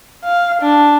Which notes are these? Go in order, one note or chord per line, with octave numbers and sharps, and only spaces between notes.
F5
D4